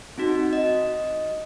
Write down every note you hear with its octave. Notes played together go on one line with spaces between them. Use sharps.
C4 D#4 F#4
D#5